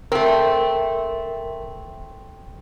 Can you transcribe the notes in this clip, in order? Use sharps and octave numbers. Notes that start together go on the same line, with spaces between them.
A3 C4 A#4 E5